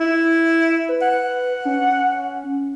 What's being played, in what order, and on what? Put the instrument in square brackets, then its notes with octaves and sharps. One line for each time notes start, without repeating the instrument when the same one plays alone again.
[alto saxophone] E4
[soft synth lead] B4
[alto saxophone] F#5
[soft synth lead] C#4